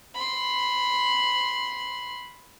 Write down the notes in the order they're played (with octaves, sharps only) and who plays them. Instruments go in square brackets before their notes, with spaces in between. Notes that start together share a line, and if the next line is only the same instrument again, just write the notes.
[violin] B5 C6